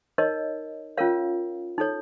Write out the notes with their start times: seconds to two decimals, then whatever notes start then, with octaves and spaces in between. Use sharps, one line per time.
0.18 D#4 A#4 C#5 D#5
0.97 C#4 F4 A#4 C#5 F5
1.78 D#4 A4 C#5